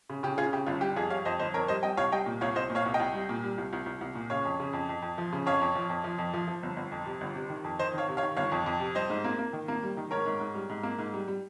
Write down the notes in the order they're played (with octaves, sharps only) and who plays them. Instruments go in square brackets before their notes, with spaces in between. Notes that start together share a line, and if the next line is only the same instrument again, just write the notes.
[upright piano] C#3
C#3 G4
C#3 F4 G#4
C#3 G4
G1 F4
G3 G4
F2 F4 G#4
G3 C#5 F5
F2 C5 D#5
G1 C5 D#5
F2 A#4 C#5
G3 C5 D#5
G3 D#5 G5
C2 C#5 F5
G3 D#5 G5
A#2
C2 C#5 F5
C2 C5 D#5
A#2
C#5 F5
C2
D#5 G5
C2
G3
A#2
G3
C2
C2
C2
C2
A#2
C#3 C#5 F5
F2
C#3
F2
F2
F2
F3
C#3
F2 C#5 F5
F2
F3
F2
F3
F2
F3
F3
G1
G1
F2
C3
G1
C3
D#3
F2
D#3 C5 D#5
D#3 C#5 F5
C3
C#5 F5
D#3
G1 C#5 F5
F2
F2
C3
G3 C5 D#5
G#2
A#3
A#3
D#3
A#3
G3
D#3
G#2 A#4 C#5
G#2
G#2
G3
G#2
A#3
G#2
G3
G3